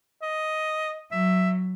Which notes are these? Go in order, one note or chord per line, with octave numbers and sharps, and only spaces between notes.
D#5
F#3 E5